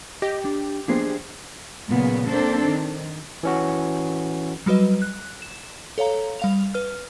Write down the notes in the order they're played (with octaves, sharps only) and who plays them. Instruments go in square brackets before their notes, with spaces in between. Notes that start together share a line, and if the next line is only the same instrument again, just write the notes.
[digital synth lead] G4 [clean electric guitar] D#5
[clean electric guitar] D4
[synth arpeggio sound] F3 A#3 B3 [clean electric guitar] D4 G#4 C5
[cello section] A#2 C#3 F#3 B3
A#3 C4 D4 A4 C5
D#3
[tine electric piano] E3 C#4 F#4
[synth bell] F#3 G3 F#4 B4 D#5
F#6
E7
A4 C#5 F5 A#5
G3 F5 F7
B4 F6